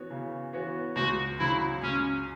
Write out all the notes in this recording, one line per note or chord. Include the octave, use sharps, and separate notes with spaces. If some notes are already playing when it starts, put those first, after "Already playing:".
Already playing: E3 B3 F#4 C#5
C#3
E3 B3 F#4 C#5
C#2 F#4
C#3 F#3 E4
C#2 C#4